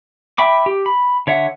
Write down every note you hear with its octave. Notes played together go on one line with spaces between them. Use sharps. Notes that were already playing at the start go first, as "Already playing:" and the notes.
E5 G5 B5 D6
G4
B5
D3 C#5 E5 F#5